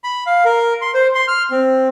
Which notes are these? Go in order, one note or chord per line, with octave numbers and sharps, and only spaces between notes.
B5
F5
A#4
C6
C5
C6
F6
C4